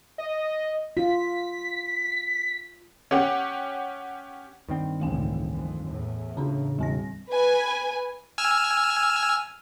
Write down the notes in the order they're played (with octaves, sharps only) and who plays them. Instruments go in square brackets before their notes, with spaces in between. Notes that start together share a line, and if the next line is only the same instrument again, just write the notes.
[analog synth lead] D#5
[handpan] F4 [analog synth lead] B6
[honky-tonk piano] C#4 G4 F#5
[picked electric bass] G2 D#3 C4
[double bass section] F1 C#2 A2 [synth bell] E3 A3 G#5
[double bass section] F2
E2 A2
[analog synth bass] C#3 [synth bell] C#4 D4
[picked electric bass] E1 [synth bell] G3 C4 A#6
[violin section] B4 G#5
[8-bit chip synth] G#5 E6 F6